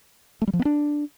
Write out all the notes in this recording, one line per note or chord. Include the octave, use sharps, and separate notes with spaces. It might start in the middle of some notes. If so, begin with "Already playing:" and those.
A3
G3
F3
B3
D4